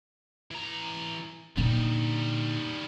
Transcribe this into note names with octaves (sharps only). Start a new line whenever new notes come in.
E3 A#5
A#2 D3 G3 D#4